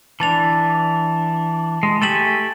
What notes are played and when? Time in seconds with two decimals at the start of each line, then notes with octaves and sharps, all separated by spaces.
0.20 E3 D4 A5 A6 F7
1.83 G#3
2.02 A3 G4 G#5 A6 E7 F#7